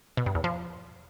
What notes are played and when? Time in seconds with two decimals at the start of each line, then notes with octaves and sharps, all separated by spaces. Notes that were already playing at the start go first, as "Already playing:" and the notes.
0.17 B2
0.26 G2
0.35 E2
0.44 F3